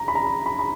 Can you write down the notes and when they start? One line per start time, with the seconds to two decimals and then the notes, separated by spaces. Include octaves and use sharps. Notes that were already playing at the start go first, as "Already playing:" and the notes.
Already playing: A#5
0.08 B5
0.15 A#5
0.46 B5
0.59 B5